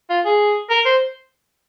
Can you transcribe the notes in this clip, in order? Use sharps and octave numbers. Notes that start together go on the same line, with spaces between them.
F4
G#4
A#4
C5